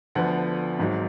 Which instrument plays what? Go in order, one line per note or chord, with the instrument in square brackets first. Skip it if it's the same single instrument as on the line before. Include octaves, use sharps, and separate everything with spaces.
[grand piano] D2 D3 F3 B3 F#5
G#1 G#2 D#3 F#3